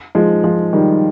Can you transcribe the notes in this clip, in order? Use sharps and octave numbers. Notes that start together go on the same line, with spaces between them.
F3 G#3
F3 G#3
D#3 G3